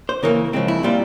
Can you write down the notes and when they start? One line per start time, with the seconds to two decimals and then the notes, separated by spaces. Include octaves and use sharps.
0.09 C5
0.23 C#3 E3 A#3 A#4
0.53 C#3 F3 G#3 C4
0.68 E4
0.83 A#2 G3 C4 F4